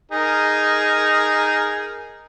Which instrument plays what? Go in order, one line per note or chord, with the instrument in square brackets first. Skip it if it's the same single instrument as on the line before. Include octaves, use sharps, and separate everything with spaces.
[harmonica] D#4 G#4 A#4